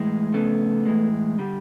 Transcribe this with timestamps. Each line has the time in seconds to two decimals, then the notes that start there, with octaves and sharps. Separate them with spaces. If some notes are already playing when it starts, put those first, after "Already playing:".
Already playing: A2 E3 G#3
0.34 F2 C#3 A3 B3
0.86 A2 E3 G#3
1.39 D3 G3